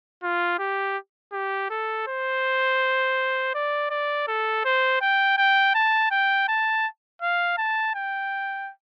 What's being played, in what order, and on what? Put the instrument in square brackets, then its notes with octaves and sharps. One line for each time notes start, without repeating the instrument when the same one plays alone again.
[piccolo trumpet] F4
G4
G4
A4
C5
D5
D5
A4
C5
G5
G5
A5
G5
A5
F5
A5
G5